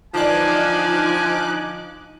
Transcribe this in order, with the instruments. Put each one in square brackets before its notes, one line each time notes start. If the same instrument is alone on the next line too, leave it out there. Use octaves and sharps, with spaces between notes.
[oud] D3 E3 D5 [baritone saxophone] F3 [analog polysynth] D#4 D6 F#6 [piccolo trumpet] G#5